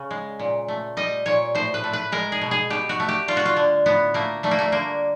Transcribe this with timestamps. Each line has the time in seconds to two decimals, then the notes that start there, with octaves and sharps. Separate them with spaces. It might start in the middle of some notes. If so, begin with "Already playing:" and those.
Already playing: C#3
0.11 G#3
0.39 A#2
0.68 A3
0.97 G3 D#5
1.26 A#2 C#5
1.55 A2 C5
1.74 B4
1.84 A3
1.93 B4
2.12 G#3 A#4
2.32 G#4
2.41 B2
2.51 G#4
2.70 B2 G4
2.89 F#4
3.00 A3
3.09 G4
3.28 G3 F4
3.37 F#4
3.45 F4
3.57 D3
3.86 A2 B3
4.14 A3 A#3
4.43 G3 A3
4.51 A#3
4.59 A3
4.72 D3 A#3